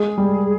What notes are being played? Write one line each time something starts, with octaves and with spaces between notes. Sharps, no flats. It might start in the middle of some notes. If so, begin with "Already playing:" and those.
Already playing: G#3 G#4
G3